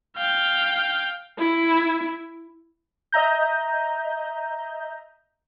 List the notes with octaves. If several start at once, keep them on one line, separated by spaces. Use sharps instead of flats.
F5 G5
E4
D#5 E5 A#5 G6